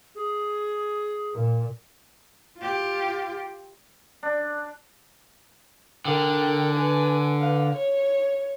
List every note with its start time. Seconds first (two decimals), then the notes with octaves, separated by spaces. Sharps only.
0.15 G#4
1.33 A#2
2.58 F4 G4
4.23 D4
6.05 D3 A#4 G5
6.71 B4 G#5
7.40 B4 F5
7.72 C#5